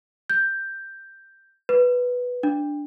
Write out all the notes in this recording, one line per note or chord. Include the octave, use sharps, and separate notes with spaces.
G6
B4
D4